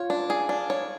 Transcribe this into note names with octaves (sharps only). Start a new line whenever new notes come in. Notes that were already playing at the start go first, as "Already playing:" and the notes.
Already playing: F4 C#5
D4
G#4
D4
C#5